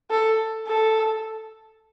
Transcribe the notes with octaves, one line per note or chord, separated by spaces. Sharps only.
A4
A4